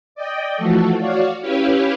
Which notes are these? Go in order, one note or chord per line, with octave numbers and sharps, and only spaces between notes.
D5 D#5 G5
E3 F3 A3 F#4 A4
F#4 C#5 D5 F5
C#4 E4 G4 B4 C#5 F5